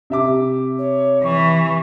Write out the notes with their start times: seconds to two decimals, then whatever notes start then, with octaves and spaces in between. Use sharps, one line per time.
0.10 C3 E5 D6
0.79 C#5
1.24 E3 C#6